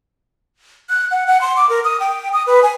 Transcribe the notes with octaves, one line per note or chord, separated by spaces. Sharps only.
F#6
F#5
F#5
C6
D6
A#4
D#6
G5
D#6
B4
G#5